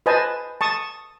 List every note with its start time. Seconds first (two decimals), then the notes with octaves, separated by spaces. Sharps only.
0.06 B4 C5 D#5 G#5 A5
0.61 A5 C#6 D#6